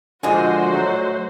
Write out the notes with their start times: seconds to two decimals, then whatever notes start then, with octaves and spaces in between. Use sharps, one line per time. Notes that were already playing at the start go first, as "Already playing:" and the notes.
0.23 A#2 D3 F3 G#3 F#4 C5 D#5 G#5
0.72 F#3 A3